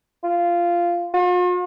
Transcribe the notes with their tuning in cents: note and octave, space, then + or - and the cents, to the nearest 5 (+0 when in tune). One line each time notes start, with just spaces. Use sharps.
F4 -10
F4 +45